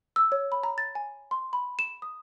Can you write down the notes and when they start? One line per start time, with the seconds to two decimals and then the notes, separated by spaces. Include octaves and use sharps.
0.16 E6
0.32 C#5
0.52 B5
0.63 A#5
0.78 A6
0.95 G#5
1.31 C6
1.53 B5
1.79 E7
2.02 D#6